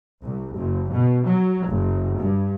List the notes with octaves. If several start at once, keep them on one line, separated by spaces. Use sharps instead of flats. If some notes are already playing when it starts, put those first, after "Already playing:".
C2
F#1
B2
F#3
F#1
G2